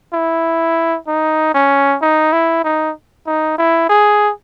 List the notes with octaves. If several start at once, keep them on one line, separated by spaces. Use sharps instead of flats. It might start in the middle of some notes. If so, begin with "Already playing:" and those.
E4
D#4
C#4
D#4
E4
D#4
D#4
E4
G#4